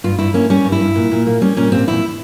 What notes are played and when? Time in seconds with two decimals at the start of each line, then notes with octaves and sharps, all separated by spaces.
0.04 G2 F4
0.19 G2 E4
0.34 A#3 C#4
0.50 G3 C#4
0.65 G2
0.72 E4
0.80 G2
0.96 A#2
1.11 A#2
1.27 A#3
1.42 G3 C#4
1.57 A#2 C#4
1.72 A#2 C4
1.87 E2 E4